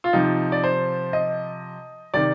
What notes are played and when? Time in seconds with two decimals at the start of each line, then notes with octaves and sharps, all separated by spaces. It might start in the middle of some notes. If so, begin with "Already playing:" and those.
0.04 F4
0.13 C3 F3 D#4
0.52 D5
0.64 C5
1.13 D#5
2.14 C3 D#3 D5